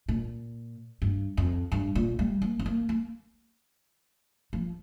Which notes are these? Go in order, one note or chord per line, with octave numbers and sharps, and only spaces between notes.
A#2
G2
F2
G2
A#2
G3
A#3
C4
A#3
A#3
F3